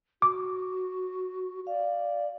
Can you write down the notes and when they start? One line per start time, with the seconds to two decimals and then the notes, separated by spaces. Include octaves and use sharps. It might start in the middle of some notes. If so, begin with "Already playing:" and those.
0.22 F#4 D6
1.67 D5 F5